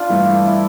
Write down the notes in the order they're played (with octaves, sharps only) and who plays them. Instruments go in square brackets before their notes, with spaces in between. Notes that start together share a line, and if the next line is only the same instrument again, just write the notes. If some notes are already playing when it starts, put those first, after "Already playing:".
Already playing: [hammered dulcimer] D4 F4
[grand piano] G2 E3 A3 E4
[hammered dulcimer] E4